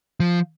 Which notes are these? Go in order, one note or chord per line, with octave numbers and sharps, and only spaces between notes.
F3